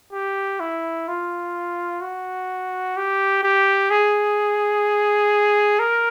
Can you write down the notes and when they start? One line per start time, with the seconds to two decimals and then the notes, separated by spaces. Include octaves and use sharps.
0.13 G4
0.60 E4
1.08 F4
2.01 F#4
2.97 G4
3.44 G4
3.90 G#4
5.79 A#4